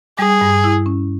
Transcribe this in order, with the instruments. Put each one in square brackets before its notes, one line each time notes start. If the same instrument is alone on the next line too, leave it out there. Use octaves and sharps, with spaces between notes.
[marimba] G3 [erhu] G#4
[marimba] G2
E4
C#4